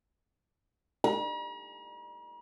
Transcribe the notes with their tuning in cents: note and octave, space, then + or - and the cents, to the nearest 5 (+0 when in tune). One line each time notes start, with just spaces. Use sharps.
A#5 +45